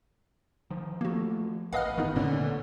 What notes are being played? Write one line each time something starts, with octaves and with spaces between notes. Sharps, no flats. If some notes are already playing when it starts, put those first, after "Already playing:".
D#3 F3
F3 A3 A#3 F#4
A1 B4 D#5 F5 F#5 D#6 F6
G1 D#3 B3 D#4
D2 A#2 D3 C#4